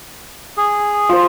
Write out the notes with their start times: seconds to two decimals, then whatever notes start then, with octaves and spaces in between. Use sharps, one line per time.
0.57 G#4
1.09 F4 C5